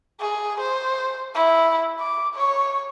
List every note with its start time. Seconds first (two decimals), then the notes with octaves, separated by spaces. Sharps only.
0.21 G#4
0.61 C5
1.35 E4
2.00 D6
2.35 C#5